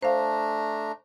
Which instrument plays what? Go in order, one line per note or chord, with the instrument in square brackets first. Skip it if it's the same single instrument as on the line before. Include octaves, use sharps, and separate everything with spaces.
[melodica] A3 D4 A#5 [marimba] C5 F5